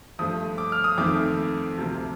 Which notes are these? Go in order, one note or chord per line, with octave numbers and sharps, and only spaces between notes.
G2 F3 A3 D#6
D6
F6
D#6
F2 D#3 A3 C4 D6
D2 C3 F3 A#3